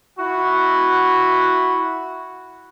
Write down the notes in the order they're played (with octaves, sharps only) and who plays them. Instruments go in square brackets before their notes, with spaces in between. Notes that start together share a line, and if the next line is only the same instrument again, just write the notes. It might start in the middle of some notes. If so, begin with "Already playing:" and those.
[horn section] E4 F#4